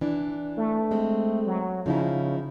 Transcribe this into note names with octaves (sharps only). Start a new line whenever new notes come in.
E3 D4
A3
G#3 C4
F#3
C#3 F3 D#4 E4